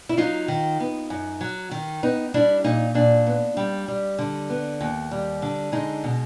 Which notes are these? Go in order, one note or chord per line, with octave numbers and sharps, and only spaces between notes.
E4
F#3 D#4 F4
D#3
B3
F#2
F#3
D#3
B3 D#4
G3 D4 E4
A#2 D#4
A#2 D4
B3
G3
G3
D3
B3
D#2
G3
D3
G#3 D#4
B2